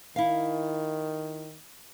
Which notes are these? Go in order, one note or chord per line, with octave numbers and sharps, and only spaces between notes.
D#3 E4 F5